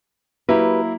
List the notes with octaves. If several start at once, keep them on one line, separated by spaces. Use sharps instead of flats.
F#3 A#3 E4 G4 B4